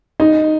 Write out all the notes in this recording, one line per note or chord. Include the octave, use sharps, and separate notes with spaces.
D#4